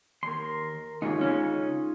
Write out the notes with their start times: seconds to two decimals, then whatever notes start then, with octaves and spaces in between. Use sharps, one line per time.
0.23 D#2 A#4 C6
1.02 D#2 G#2 C#3 D#4 F4 C#5
1.21 C#3 G#3 C#4